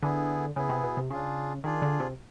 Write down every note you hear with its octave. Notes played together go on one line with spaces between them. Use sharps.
D3 B3 E4 G#4
C#3 B3 E4 G#4
C3
B2
C3
C#3 D4 F4 G#4
D#3 D4 F4 G#4
D3
C3